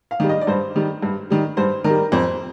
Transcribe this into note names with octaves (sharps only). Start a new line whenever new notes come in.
F5
D#3 G3
D#5
D5
G2 C5
D#3 G3
G2
D#3 G3
G2 C5
D#3 A#4
G3
F2 C5